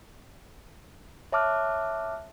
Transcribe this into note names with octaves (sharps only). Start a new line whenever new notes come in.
C#5 E5 A5 D6 F6 F#6